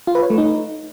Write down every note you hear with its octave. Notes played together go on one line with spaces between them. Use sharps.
F4
B4
C#5
A3
D#4